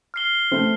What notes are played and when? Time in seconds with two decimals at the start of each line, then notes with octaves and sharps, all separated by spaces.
0.14 F6 C7 G7
0.51 A3 C4